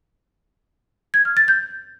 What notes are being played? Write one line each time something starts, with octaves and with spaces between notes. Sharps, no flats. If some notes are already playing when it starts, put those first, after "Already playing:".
G#6
F6
A6
G6